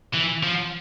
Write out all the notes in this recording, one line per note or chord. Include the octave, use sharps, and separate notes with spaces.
E3
F3